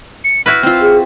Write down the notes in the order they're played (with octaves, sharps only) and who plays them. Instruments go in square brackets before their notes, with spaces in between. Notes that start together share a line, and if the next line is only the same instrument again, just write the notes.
[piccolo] C#7
[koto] E4 F#4 B4 [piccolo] F6
[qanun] C4 F4
[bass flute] G#4